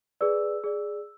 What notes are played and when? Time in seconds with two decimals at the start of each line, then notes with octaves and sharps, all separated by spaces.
0.21 G#4 B4 D5 E6
0.64 G#4 D5